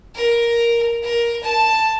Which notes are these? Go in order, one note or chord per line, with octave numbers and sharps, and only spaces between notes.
A#4
A#4
A5